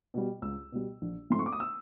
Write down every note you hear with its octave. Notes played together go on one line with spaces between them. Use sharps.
B2 G3
C#2 E6
B2 G3
A#1
G#2 F3 A3 C4 C6
C#6
D6
D#6
E6